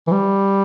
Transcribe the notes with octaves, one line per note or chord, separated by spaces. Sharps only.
E3
G3